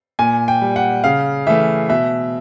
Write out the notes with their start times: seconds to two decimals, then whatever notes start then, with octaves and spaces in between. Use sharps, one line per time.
0.19 A#2 G#5
0.48 G5
0.61 G3
0.76 F#5
1.04 C#3 F5
1.47 E3 A3 E5
1.89 B2 E5